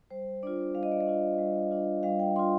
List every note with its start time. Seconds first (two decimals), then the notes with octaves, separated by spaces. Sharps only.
0.11 G3 C5
0.43 D4 F4 D5
0.74 G3 F5
0.83 D#5
0.92 D5
1.00 D#5
1.07 D4 F4
1.39 G3
1.71 D4 F4
2.03 G3 F5
2.20 G5
2.36 D4 F4 C6